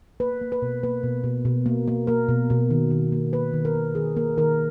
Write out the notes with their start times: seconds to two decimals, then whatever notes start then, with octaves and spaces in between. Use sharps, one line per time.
0.20 A#3 B4
0.41 A#3
0.52 B4
0.62 B2
0.83 A#3 B4
1.03 B2
1.24 B2
1.45 B2
1.66 A#3
1.88 A#3
2.07 A#3 A#4
2.29 B2
2.50 B2
2.70 D#3
2.91 D#3
3.12 A#3
3.33 A#3 B4
3.53 D#3
3.65 A#4
3.75 A#3
3.95 D#3 G#4
4.17 A#3 A#4
4.37 D#3 A#4